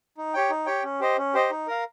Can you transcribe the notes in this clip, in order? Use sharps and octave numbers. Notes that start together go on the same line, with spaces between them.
D#4
G4 C#5 G5
D#4
G4 C#5 G5
C#4
G4 C5 D#5
C#4
G4 C5 D#5
D#4
A#4 F5